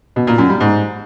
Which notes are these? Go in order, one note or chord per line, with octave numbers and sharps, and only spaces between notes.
B2
A#2
F#2
G3
G#2